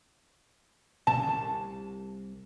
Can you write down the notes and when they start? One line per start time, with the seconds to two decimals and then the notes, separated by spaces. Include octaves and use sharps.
1.07 B2 D3 C#4 A5
1.27 C2